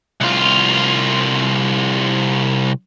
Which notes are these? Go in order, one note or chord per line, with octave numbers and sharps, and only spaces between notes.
C2 F4